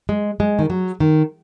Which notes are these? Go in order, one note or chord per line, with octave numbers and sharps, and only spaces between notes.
G#3
G#3
D#3
F#3
D#3